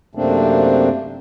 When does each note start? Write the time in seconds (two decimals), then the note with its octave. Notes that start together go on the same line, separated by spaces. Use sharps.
0.15 F#2 C3 A3 A#3 C4 D4